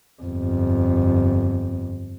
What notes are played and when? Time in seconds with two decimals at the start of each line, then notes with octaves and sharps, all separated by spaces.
0.22 G1 F2